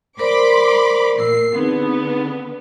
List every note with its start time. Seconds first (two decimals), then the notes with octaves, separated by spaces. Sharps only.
0.19 A#4 C5 D5 B5 C6 D6
1.18 A#2 A#4 E6 C7
1.55 D3 B3 C4 D#4 G#4